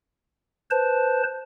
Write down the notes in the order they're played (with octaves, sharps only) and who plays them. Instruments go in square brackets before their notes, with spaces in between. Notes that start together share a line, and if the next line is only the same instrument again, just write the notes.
[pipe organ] B4 C5 A5